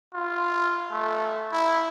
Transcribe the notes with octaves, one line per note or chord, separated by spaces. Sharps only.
F4
A3
E4